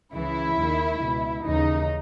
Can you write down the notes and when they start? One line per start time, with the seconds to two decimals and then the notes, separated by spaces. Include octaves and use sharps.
0.13 C#2 C#3 E3 E4
0.57 D#2 D#3
1.02 C#2 B2
1.45 D#2 C#3 E3 D#4